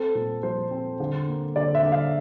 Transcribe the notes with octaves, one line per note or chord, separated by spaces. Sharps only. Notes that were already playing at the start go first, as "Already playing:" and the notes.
Already playing: C4 A4
A#2
F3 C5
C4
D3
A#3
D3 D5
E5
D3
F5